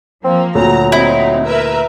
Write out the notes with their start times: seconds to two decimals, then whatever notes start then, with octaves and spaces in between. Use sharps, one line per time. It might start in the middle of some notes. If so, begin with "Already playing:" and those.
0.24 F3 A#3 C4
0.55 D2 A#2 F#3 A#5
0.92 C4 D#4 E4
1.44 A#4 B4 E5